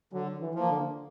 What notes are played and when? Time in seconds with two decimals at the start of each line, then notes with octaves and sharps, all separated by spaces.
0.13 D3 F#3
0.41 E3
0.55 F3 A#3
0.69 D3